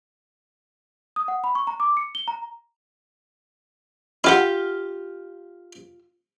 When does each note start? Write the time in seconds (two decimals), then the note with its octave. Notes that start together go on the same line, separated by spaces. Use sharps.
1.16 D#6
1.28 F#5
1.44 B5
1.55 C#6
1.67 A#5
1.80 D6
1.97 C#7
2.15 G7
2.28 A#5
4.24 E4 F4 G4 A4 F#5